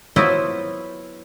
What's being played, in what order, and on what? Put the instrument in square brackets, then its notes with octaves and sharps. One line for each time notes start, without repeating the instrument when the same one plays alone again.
[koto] F#3 B3 E4 F4 B4 C5